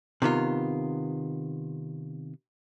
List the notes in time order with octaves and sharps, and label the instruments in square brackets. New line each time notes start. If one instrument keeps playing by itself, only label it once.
[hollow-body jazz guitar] C3 D#3 B3 F4